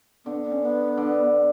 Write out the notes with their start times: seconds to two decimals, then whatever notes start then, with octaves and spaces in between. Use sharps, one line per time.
0.25 D3 B3
0.43 B3
0.52 C#4
0.62 B3
0.97 D3